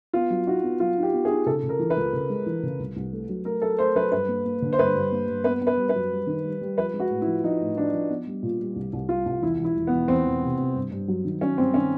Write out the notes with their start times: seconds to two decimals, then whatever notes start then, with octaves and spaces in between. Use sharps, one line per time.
0.13 B3 F4
0.30 F#3
0.47 D#4 F#4
0.63 B3
0.80 F#3 F4
0.98 D#4
1.03 G4
1.13 B3
1.25 G#4
1.30 D#4
1.46 C#3 A4
1.63 C#3
1.69 A#4
1.79 E3
1.90 B4
1.96 C#2
2.13 C#3
2.30 G#3
2.46 E3
2.63 C#3
2.79 C2
2.96 C2
3.13 A3
3.29 F#3
3.45 A3 A#4
3.62 F#3 A4
3.79 A3 C5
3.95 F#3 B4
4.12 G2 B4
4.28 A#3
4.45 A#3
4.62 D3
4.73 C5
4.79 G2 B4
4.95 G2
5.12 A#3
5.28 G2
5.44 B3 B4
5.62 B3
5.67 B4
5.77 G3
5.89 B4
5.95 F#2
6.11 G3
6.27 D#3
6.45 G3
6.61 G3
6.77 F3 B4
6.93 G#3
7.00 F#4
7.10 A2
7.22 E4
7.27 F3
7.44 F3 D#4
7.61 A2
7.77 F3 D4
7.93 F3
8.10 B3
8.27 G3
8.43 A#2
8.60 G3
8.76 C2
8.93 C2
9.09 G3 F4
9.26 C2
9.42 E2 E4
9.59 E1
9.64 E4
9.76 E1
9.87 B3
9.92 E1
10.08 E2 C4
10.26 E1
10.43 C3
10.58 C3
10.75 G2
10.91 G2
11.08 F#3
11.25 D#3
11.41 F#3 C#4
11.58 G2 C4
11.74 D#3 C#4